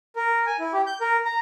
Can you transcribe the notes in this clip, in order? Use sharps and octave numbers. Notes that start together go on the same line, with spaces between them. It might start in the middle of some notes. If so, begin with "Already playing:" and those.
A#4
G#5
E4
G4
G6
A#4
A#5